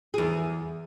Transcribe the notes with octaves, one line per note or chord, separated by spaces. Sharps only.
E2 G#4